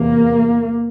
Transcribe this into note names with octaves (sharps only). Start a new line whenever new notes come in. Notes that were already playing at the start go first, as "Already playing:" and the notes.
Already playing: E2 C3 A#3